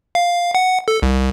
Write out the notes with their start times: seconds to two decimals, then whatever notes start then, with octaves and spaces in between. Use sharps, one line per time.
0.15 F5
0.55 F#5
0.88 A4
1.02 C2